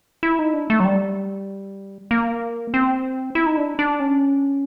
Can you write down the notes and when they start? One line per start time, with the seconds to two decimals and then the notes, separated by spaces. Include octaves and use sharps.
0.23 E4
0.39 D#4
0.54 D4
0.70 A3
0.80 F#3
0.85 G3
2.11 A#3
2.74 C4
3.35 E4
3.47 D#4
3.57 D4
3.79 D4
4.00 C#4